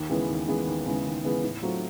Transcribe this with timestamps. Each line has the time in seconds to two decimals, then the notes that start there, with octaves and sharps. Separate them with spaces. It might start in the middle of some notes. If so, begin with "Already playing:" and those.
Already playing: D#2
0.10 C#3 E3 G#3 B3
0.28 D#2
0.48 C#3 E3 G#3 B3
0.67 D#2
0.86 C#3 E3 G#3 B3
1.05 D#2
1.24 C#3 E3 G#3 B3
1.43 A2
1.62 F#3 A3 C4 F4